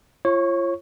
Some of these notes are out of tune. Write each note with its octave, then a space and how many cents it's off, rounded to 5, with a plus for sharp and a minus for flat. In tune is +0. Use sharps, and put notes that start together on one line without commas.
F4 -30 C#5 -30 C#6 +0